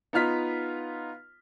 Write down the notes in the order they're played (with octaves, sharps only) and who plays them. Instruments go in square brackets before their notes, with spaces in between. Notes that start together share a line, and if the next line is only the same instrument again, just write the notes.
[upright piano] B3 D#4 F4 F6 B6